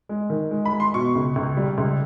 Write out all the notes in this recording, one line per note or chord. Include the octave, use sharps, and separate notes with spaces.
G#3
D#3
G#3
B5
G#3
C6
B2 C#6
C#2
C#2
G3
C#2